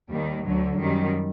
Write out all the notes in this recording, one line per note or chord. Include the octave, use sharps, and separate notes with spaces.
D#2 D#3 G3
D2 D3 F#3
F#2 D#3 G3